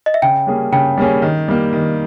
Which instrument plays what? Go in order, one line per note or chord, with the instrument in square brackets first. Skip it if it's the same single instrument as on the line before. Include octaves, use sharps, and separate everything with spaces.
[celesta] D#5
E5
[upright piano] C#3 [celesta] G5
[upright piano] G3 A#3 C#4 G#4
[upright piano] C#3 [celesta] G5
[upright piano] G3 A#3 C#4 G#4
D#3
G3 A#3
D#3